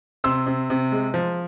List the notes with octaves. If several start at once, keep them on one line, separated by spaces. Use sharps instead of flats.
C3 C6 E6
C3
C3
G#3
F3